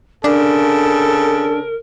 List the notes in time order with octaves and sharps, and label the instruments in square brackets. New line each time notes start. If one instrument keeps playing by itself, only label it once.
[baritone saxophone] C#3 [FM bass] D4 [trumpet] A4 [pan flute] A#4